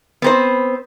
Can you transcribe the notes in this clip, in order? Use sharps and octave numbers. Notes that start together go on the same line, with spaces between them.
B3 C4 C5